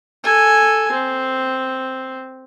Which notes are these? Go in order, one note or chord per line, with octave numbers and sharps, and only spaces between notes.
A4 G#5
C4